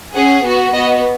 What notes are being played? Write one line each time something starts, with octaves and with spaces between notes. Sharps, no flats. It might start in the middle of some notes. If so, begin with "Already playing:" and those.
C#4 G#4 F#5
B3 F#4
B3 F#4 D#5